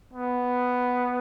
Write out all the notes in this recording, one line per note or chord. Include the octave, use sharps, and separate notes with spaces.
B3